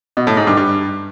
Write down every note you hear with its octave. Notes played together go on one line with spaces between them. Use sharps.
B2
A2
G#2
G2
G2